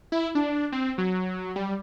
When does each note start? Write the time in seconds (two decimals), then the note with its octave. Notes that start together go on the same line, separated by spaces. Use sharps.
0.12 E4
0.35 D4
0.72 C4
0.98 F#3
1.56 G3